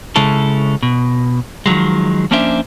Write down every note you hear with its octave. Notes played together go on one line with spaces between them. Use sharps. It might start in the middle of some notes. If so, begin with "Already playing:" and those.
C#3 G#3 C#4 E4 A4
B2
D#3 F3 F#3 G#3
F3 A#3 C#4 D4 C5 E5